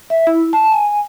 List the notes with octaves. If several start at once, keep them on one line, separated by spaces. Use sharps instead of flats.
E5
E4
A5
G#5